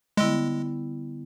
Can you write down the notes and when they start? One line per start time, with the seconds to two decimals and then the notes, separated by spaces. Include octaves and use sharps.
0.17 D3 G3 G#3 B3 E4